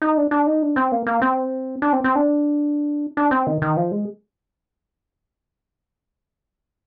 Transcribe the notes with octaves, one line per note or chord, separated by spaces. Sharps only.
D#4
D4
D4
D#4
D4
C4
A#3
A#3
C4
D4
C4
C4
D4
D4
C4
D#3
D#3
F3
G#3